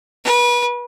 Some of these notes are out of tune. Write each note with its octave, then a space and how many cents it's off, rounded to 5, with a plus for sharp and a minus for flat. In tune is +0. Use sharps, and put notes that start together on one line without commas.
B4 -30